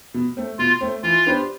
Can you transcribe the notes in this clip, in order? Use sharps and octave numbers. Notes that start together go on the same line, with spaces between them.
B2
A3 C4
B2 F4
A3 C4
E3 F4
B3 D4 G4 C5